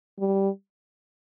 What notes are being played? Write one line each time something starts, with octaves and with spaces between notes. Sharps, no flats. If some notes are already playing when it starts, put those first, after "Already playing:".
G3